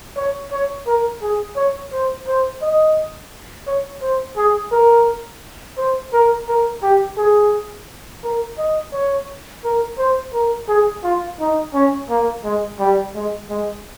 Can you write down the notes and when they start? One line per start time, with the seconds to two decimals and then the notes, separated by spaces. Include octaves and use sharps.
0.17 C#5
0.51 C#5
0.87 A#4
1.22 G#4
1.56 C#5
1.92 C5
2.27 C5
2.62 D#5
3.67 C#5
4.02 C5
4.37 G#4
4.72 A#4
5.78 C5
6.13 A#4
6.49 A#4
6.83 G4
7.18 G#4
8.24 A#4
8.58 D#5
8.93 C#5
9.64 A#4
9.98 C5
10.34 A#4
10.68 G#4
11.04 F4
11.40 D#4
11.74 C#4
12.10 A#3
12.44 G#3
12.80 G3
13.15 G#3
13.50 G#3